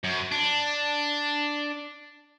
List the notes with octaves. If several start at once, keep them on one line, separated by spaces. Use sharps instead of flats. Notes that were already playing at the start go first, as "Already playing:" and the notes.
F#2
D4